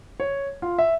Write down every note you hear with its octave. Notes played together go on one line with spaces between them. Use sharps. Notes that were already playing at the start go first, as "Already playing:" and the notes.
C#5
F4
E5